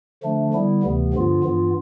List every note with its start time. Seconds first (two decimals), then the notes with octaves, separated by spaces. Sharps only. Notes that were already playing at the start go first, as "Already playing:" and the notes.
0.23 D3 F3 A3 D4
0.54 D3 G3 B3 E4
0.83 D2 C3 E3 B3
1.14 G2 D3 F3 B3 F4
1.44 G2 E3 B3 F4